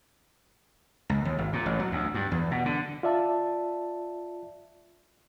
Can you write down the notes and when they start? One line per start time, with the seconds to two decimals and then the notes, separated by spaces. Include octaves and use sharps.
1.10 C#2
1.25 D#2
1.38 G#1
1.53 A#2
1.66 A1
1.79 F#3
1.92 D2
2.14 G2
2.32 E2
2.51 B2
2.66 D3
3.03 F4 D5 E5 A5